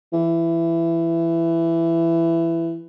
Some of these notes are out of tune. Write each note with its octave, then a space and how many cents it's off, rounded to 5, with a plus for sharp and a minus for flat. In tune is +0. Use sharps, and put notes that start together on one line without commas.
E3 +15